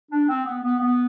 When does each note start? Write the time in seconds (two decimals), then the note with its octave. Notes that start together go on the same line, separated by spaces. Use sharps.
0.11 D4
0.28 C4
0.46 B3
0.63 B3
0.80 B3